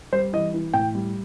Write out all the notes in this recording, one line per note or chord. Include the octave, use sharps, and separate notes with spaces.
G3 C5
E3 D#5
E3
A2 G5
G3